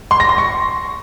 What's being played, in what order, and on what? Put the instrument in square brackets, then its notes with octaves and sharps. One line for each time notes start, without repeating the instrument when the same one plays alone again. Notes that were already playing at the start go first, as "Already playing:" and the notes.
[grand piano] C6
A#6
C6
C#6